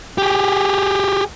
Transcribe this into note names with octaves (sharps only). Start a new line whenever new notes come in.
G4 G#4